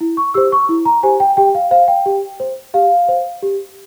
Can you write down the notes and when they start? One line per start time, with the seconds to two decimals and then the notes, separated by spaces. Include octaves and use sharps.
0.01 E4
0.17 C#6
0.34 G4 C5 E6
0.52 C#6
0.69 E4
0.85 A#5
1.03 G4 C5 G#5
1.20 G5
1.37 G4 G5
1.55 F5
1.71 C5 F5
1.88 G5
2.06 G4
2.40 C5
2.74 G4 F5
3.08 C5
3.42 G4